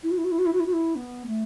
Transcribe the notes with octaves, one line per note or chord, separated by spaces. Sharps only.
E4
F#4
E4
F#4
E4
F#4
E4
F#4
E4
F#4
E4
B3
A3